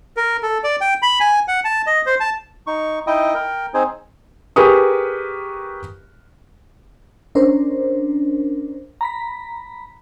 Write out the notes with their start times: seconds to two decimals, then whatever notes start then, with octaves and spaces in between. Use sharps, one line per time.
0.17 A#4
0.43 A4
0.64 D5
0.81 G5
1.02 B5
1.20 G#5
1.48 F#5
1.64 A5
1.87 D#5
2.06 C5
2.20 A5
2.67 D#4 C#6
3.07 D#4 E4 D#5 G5 D#6
3.34 A#4 G5
3.74 C4 D#4 G#4 C5 G#5
4.56 G4 G#4 A#4 B4 C#6 D#6
7.35 C#4 D4 A#4 C5
9.01 A#5 B5 B6